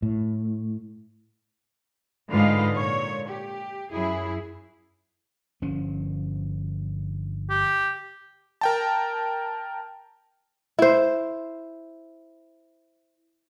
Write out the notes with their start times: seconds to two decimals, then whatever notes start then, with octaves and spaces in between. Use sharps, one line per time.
0.02 A2
2.30 G#2 D3 F4 B4 D#5 F5
2.76 A#2 C#5
3.28 G4
3.91 F#2 F#3 E4 G#4
5.62 G1 F3 C#4
7.50 G4
8.61 A#4 G5 A5
10.79 E4 C5